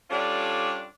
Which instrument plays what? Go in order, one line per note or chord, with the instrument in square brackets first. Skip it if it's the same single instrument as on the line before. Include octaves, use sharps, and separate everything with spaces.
[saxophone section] G3 C#4 D4 F4 A4 D5